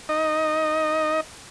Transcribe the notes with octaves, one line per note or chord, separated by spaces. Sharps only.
D#4 D#5